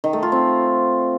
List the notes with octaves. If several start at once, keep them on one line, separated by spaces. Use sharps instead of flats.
D#3
A3
F4
C4